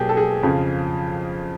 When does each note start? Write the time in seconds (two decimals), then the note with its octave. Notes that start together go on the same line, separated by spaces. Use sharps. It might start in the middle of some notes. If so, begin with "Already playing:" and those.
Already playing: B2 F#3 A#3 G4 G#4
0.09 A4
0.17 G#4
0.43 F2 C#3 F3